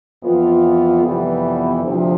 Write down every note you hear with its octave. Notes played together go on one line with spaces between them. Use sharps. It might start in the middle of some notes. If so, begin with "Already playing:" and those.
F2 E3 B3 F4
F2 C3 E3 G3 B3
D2 C3 F3